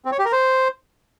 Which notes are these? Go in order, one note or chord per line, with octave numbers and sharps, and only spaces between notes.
C4
C#5
G4
A#4
C5